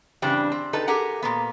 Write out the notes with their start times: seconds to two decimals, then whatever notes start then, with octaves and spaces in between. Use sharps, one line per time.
0.22 G2 C#3 E3 C4 D4 G4
0.52 C4
0.73 D#4 G4 A4 B4
0.88 G4 G#4 A#4 F#5
1.23 A#2 A#3 B3